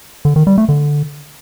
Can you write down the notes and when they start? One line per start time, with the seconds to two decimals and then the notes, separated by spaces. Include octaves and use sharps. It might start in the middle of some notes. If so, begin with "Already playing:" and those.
0.25 D3
0.36 D#3
0.47 G3
0.58 A3
0.69 D3